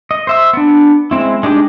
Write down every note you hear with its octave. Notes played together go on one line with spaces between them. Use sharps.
D#5
C5 E5 E6
B3 D4
G#3 C4 E4
G#3 D4 D#4 G4